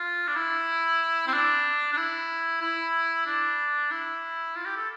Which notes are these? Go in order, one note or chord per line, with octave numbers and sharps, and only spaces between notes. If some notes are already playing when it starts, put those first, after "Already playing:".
Already playing: F4
D4
E4
C4
D4
D4
E4
E4
D4
E4
F4
G4
A4